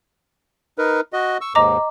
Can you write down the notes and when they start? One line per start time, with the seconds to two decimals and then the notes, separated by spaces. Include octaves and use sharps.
0.78 D#4 A#4 B4
1.13 F#4 D#5
1.41 C#6 E6
1.55 D#2 G#2 D#5 A#5 D6